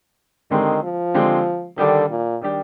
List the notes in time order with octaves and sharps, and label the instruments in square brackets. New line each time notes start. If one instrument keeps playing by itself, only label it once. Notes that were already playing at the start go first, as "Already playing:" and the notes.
[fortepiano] D3 G#3 C4 G4 [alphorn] D#3
[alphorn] F3
[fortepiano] D3 G#3 C4 G4
[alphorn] D3 [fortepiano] D#3 G3 D4 G4
[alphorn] A#2
[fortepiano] D#3 G3 D4 G4